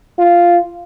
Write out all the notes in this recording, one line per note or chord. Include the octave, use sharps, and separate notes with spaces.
F4